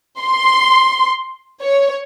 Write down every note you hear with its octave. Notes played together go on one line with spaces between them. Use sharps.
C6
C#5